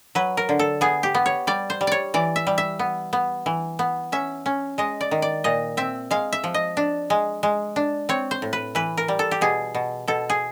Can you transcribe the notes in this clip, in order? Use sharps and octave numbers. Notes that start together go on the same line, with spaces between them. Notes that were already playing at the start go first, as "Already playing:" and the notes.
F#3 B4
A#4
D3
A4
B3 G#4
G4
B3
C#5
G3 D5
C5
G3
C#5 D5
E3 D5
E5
G3
E5
B3
B3
E3
B3
C#4 E5
C#4
G#3 D#5
D5
D#3
D5
A#2 D#5
C4 E5
G#3 F5
E5
F3
D#5
D4
G#3
G#3
D4
C4 C#5
C5
A2
B4
E3 B4
A#4
G3
A4
G4
B2 G#4
B2
B2 A4
G#4